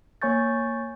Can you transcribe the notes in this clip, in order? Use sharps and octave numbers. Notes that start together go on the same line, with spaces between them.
A#3 C#5 G#5 C#6 G6 A6